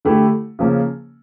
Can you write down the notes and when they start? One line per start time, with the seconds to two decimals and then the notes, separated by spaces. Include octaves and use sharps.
0.05 D3 A3 E4 G4
0.59 C#3 F3 A#3 C#4